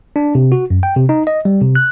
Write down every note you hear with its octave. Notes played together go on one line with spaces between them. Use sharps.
D4
C3
F#4
F#2
G5
C3
D#4
D#5
G3
C3
F#6